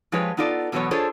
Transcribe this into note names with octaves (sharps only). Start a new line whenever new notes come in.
F3 G#3 F4 G4 B4 C#5
B3 D#4 F4 A4 D5
E2 B2 F3 F#3 B3 C#5
D4 F4 G#4 A4 C5 C#5